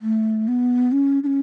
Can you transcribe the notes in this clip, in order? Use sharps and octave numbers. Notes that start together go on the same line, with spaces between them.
A3
B3
C#4
D4
C#4